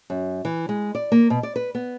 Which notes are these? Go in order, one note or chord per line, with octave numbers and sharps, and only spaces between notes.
F#2
E3
G#3
D5
A#3
B2
D5
B4
B3